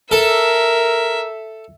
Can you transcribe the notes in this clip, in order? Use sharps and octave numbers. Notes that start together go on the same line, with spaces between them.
A4 A#4 E5